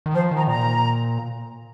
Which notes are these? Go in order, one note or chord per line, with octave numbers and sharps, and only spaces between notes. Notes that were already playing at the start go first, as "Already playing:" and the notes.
D#3
F3 C5
D#3
A#5
A#2 A#5